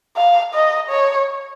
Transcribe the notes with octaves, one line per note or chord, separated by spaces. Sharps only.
F5
D#5
C#5